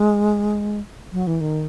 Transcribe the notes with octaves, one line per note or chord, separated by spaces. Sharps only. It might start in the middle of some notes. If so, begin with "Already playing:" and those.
Already playing: G#3
F#3
E3
D#3